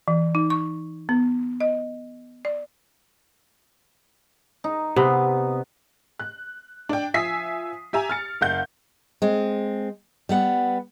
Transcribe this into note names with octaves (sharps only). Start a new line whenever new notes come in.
E3
D#4
C#6
B3
D#5
D5
D#4
C3 B3
F#6
D4 G5
F3 E5 G#5 D#6 B6 C7
G4 E5 G#5 A#5
F6 A6 C#7
F#1 F5 F#5 G6
G#3 C4
G3 B3 F#5